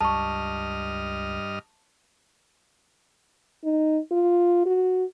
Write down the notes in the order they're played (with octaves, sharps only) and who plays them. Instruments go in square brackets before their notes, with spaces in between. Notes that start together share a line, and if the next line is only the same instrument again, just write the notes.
[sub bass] C#2 [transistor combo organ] G2 D#5 F6 [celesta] A5 C#6
[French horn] D#4
F4
F#4